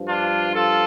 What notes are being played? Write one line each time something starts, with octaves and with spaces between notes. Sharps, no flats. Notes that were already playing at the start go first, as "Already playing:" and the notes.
Already playing: G2 F3
D4 F4
F4 A4